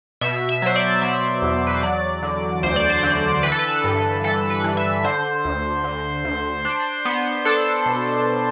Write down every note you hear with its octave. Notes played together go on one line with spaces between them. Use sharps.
B2 E5
E5
F#3 C5
D5
F#3 E5
E2
B4
C5
F#3 D5
D3
D2 C5
D5
C5
D3
E3 B4
A4
B4
G2
E3 A4
B4
E3
E5
D3 C5
D2
D3
D2
D4
B3
D4 A4
B2